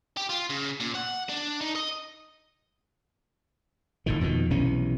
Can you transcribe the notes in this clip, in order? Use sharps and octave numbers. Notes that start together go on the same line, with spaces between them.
G4
F4
C#3
A#2
F#5
D4
D#4
D#5
F1 A2 D#3
F2 B2 D#3
B1 C3 E3 C#4